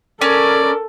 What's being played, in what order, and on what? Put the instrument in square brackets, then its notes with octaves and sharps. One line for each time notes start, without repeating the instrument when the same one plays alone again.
[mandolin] C#4 [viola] A4 [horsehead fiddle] A#4 [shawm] D5